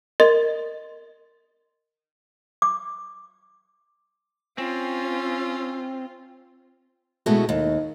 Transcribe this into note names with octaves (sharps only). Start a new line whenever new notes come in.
A#4 D#5 C6 A6
D6
C4 C#4 F4
B2 G#3 A3 B3 E4 F#4
D#2